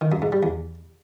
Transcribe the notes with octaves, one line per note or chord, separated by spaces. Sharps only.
D#3
F#2
G#2
G3
E2